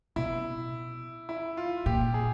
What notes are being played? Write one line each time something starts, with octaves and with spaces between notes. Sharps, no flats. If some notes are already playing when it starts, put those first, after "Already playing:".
B2 E4
E4
F4
A#2 G4
G#4